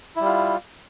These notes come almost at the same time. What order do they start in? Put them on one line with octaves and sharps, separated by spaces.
E4 G3 F4